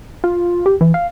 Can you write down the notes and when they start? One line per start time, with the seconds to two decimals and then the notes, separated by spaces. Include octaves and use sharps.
0.24 F4
0.66 G4
0.81 E3
0.94 F5